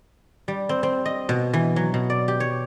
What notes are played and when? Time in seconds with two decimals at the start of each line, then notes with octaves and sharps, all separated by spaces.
0.48 G3
0.69 C4
0.83 C4
1.05 D#5
1.29 B2
1.53 E3
1.76 F#3
1.94 B2
2.10 D5
2.28 G4
2.40 C#5